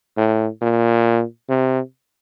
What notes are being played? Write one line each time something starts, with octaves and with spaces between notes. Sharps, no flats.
A2
A#2
C3